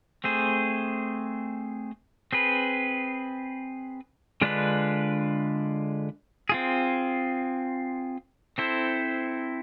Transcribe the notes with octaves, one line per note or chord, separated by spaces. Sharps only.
A3 C4 G#4 C5
C4 G#4 B4
D3 G#3 D4 F4 B4
C4 F4 G#4
C4 E4 A4 C5